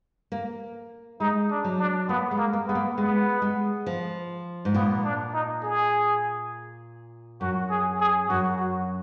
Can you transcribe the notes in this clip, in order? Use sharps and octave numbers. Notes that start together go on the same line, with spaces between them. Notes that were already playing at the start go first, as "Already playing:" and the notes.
A#3
G#3 D#4
D4
F#3
D4
A#3 B3
G#3
A#3
A#3
G#3 B3
A#3
G#3 B3
G#3
F3
G#2
A#2 B3
D4
D#4
G#4
F#2 F#4
G#4
G#4
F#2 F#4
F#4